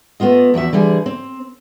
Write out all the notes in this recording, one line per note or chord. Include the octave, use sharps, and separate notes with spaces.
A3 B3 F4 D#5
E2 F3 F#4 E5
D3 E3 G3 G#4
C4